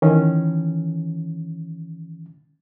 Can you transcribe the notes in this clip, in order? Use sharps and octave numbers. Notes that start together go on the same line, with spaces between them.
D#3 E3 C#4